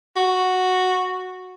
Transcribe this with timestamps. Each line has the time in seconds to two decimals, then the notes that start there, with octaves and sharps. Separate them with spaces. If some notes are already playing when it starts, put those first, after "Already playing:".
0.16 F#4